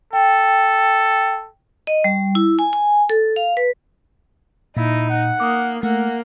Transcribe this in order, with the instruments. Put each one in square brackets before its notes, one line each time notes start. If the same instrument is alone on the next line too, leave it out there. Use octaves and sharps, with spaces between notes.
[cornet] A4 [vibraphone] G5
[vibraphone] D#5
G3
E4
G#5
G#5
A4
F5
B4
[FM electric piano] A#2 [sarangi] D#4 [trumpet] E4
[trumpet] F#5
[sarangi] A#3 [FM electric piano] D6 D#6
[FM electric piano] A3 [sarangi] A#3 [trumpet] F#5